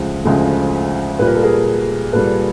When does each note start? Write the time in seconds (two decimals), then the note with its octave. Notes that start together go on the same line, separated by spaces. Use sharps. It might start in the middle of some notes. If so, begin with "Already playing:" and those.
Already playing: D2 C#3 F3 G#3
0.25 D2 C#3 F3 G#3
1.19 A#2 G3 B4
1.27 A#4
1.35 A4
1.43 G#4 A#4
2.13 A#2 G3 A4 B4